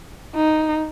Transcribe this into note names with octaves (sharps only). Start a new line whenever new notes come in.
D#4